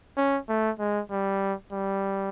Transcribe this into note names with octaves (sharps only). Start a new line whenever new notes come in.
C#4
A3
G#3
G3
G3